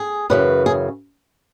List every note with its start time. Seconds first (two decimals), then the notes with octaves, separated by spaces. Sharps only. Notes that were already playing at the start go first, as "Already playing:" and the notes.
Already playing: G#4
0.30 F#2 C#3 E3 B4
0.66 G#4